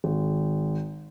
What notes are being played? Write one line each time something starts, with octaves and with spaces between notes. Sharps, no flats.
G#1